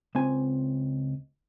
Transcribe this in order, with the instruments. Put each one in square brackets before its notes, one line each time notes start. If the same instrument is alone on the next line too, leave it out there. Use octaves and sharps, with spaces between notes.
[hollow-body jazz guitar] C#2 C4 G#5